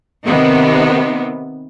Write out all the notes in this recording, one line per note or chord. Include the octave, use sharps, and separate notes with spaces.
C3 D#3 B3